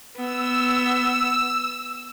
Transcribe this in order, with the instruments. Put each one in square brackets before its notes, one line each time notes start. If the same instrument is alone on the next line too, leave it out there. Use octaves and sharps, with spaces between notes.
[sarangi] B3 [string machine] E6